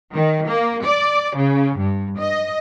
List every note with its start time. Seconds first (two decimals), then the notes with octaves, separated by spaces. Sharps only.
0.13 D#3
0.47 A#3
0.86 D5
1.37 C#3
1.78 G2
2.18 D#5